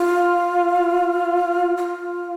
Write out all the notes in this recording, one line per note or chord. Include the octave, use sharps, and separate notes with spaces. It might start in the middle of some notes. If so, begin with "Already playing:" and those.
Already playing: F4
F4